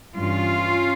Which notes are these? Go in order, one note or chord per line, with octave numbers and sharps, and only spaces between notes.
G2 E3 C#4 F4